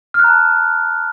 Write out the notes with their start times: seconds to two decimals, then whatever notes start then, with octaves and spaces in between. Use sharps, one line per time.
0.14 F6
0.19 F#6
0.24 A#5
0.29 A5